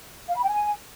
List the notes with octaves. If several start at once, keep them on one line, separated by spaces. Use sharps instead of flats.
F5
B5
G5
G#5